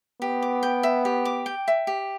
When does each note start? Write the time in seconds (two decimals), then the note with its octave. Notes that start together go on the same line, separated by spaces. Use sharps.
0.21 B3 G4
0.42 D6
0.63 G5
0.83 E5
1.05 G4
1.25 D6
1.46 G5
1.68 E5
1.87 G4